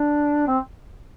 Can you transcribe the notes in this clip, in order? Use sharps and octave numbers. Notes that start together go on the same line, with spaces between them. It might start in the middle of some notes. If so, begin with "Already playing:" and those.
Already playing: D4
C4